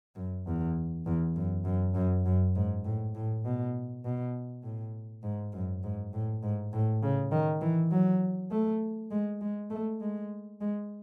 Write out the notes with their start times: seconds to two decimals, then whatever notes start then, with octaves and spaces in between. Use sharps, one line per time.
0.16 F#2
0.46 E2
1.06 E2
1.36 F#2
1.65 F#2
1.95 F#2
2.26 F#2
2.55 G#2
2.84 A2
3.15 A2
3.45 B2
4.05 B2
4.63 A2
5.23 G#2
5.53 F#2
5.84 G#2
6.13 A2
6.43 G#2
6.73 A2
7.03 C#3
7.32 D#3
7.61 E3
7.91 F#3
8.51 A3
9.11 G#3
9.41 G#3
9.70 A3
10.01 G#3
10.61 G#3